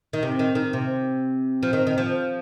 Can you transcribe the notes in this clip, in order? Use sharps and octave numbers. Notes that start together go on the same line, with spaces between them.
D#3
C3
D#3
D#3
C3
F3
D#3
D#3
F3